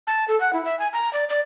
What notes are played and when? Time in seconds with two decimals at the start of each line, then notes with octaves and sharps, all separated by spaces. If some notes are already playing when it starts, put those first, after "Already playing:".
0.07 A5
0.28 A4
0.40 F#5
0.53 E4
0.65 E5
0.79 G#5
0.93 A#5
1.13 D5
1.29 D5